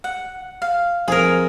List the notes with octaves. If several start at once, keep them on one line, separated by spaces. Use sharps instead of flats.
F#5
F5
F2 G#4 A#4